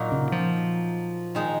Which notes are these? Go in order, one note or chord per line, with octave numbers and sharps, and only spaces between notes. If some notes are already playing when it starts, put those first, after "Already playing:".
Already playing: A#2 F#3 A#3 D#4 F#4
C#3
F3
D#3 G#3 D#4